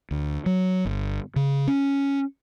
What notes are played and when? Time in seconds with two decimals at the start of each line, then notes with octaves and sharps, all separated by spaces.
0.11 D2
0.46 F#3
0.85 G1
1.36 C#3
1.68 C#4